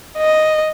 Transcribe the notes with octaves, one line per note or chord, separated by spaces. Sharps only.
D#5